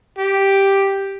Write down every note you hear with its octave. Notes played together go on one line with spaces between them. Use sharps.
G4